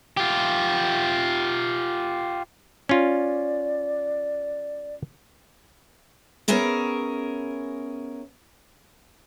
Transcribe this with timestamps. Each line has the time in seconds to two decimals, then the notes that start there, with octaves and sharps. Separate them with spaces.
0.17 F4 G4
2.89 C#4 F4 D5
6.48 B3 C#4 G#4 A#4 E5